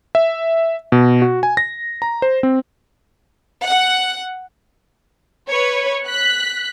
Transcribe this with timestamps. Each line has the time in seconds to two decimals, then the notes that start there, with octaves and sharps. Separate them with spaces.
0.15 E5
0.92 B2
1.22 F#4
1.43 G#5
1.57 A#6
2.02 A#5
2.22 C5
2.43 C4
3.65 F#5
5.49 B4 C#5
6.07 F#6 B6